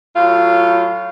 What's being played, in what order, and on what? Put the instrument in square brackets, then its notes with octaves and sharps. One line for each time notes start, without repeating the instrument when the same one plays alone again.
[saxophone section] A2 F#3 F4